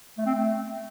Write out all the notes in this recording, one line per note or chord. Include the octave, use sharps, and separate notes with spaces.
A3
C4
A3